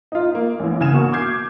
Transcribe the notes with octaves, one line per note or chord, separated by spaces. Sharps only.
D#4 F4
A#3 F5
A1 E3
C#3 G#5 E7
B2 A#3 F#4 C#6
D6 F6 G6 G#6 C7